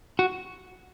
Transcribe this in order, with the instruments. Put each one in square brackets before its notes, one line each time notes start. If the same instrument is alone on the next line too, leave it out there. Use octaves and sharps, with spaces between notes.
[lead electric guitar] F#4